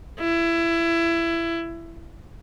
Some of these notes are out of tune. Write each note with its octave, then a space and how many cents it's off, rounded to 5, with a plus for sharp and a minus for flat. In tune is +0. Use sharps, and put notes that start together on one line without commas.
E4 +20